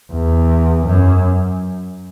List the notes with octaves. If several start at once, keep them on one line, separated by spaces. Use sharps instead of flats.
E2
F#2